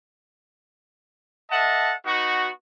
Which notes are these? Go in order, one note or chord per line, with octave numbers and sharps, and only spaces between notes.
A4 D#5 E5 F#5 A5
B3 D#4 F#4